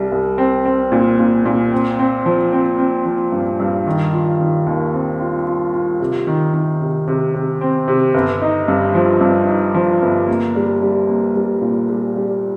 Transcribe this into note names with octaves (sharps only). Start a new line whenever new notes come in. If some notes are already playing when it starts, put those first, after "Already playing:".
Already playing: C2 G3
C2
C4
C4
A#2
A#2
A#2
C4
C4
F3
C4
C4
F3
G2
G2
D#3
F4
D#3
D#2
C4
F4
F4
F4
C3
D#3
D#3
C3
C3
C3
C4
C3
G1
D#4
G2
F3
G2
D#4
F3
G1
A#3
G3
G3
A#3
G3
A#2
G3
G3